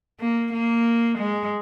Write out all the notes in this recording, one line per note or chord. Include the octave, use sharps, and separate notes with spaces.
A#3
A#3
G#3